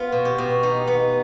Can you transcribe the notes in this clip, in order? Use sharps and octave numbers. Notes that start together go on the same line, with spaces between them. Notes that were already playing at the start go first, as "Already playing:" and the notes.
Already playing: B3 F4
B2
G4
B2
D#4 G4
B3